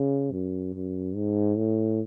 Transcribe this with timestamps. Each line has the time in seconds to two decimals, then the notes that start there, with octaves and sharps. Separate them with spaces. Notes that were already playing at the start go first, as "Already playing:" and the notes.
Already playing: C#3
0.32 F#2
0.74 F#2
1.15 G#2
1.57 A2